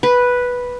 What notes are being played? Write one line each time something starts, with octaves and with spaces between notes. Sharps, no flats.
B4